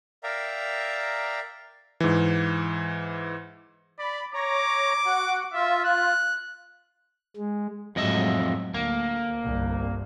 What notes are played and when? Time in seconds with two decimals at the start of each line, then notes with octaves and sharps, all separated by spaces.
0.23 A#4 D5 E5 F5 G5 A#5
2.00 G#2 E3
3.99 D5 B5
4.34 C#5 A#5 D6
5.05 F#4 F#5
5.53 F4 E5
5.84 F#6
7.37 G#3
7.96 F2 A2 F#3 G#3 D#5 E5
8.74 D2 A#3
9.43 G1 C2